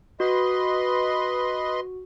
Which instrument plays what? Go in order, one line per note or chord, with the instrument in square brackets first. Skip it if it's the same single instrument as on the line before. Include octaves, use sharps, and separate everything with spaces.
[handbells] F#4 [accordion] B4 D#5 C6